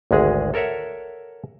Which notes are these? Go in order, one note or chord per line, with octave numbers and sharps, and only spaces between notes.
G#1 D2 G#3 G#4
A4 A#4 C#5 E5 F#5